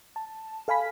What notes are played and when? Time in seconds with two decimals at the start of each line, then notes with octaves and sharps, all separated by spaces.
0.16 A5
0.68 A4 F5 G#5 B5 B6